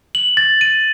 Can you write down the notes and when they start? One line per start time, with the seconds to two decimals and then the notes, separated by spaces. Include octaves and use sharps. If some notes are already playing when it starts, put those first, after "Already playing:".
0.15 F#7
0.37 A6
0.61 D#7